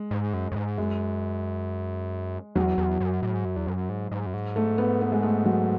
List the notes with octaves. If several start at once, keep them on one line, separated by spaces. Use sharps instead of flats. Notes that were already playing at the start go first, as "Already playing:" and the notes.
Already playing: G#3
G#2
F#2
F#2
G#2
F#2 G#3
E2 F#3
E2
F#2
A2
G#2
F#2
E2
F#2
G#2
G#2
F#2
G#2
A3
B3
B3
G#3
A3
F#3